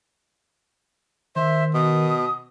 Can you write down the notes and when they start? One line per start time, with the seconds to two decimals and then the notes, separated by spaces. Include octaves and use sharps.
1.36 D#3 C5 E5
1.74 B2 D#6